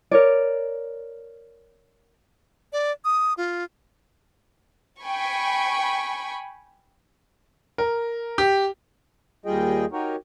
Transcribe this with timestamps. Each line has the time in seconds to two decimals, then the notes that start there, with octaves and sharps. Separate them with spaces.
0.11 A#4 C#5 D5
2.73 D5
3.04 D#6
3.37 F4
5.02 G5 G#5 B5 C#6
7.78 A#4
8.38 G4
9.46 D#2 G3 F4 G#4 D#5 G5
9.92 D#4 F#4 G4 A#4 C#5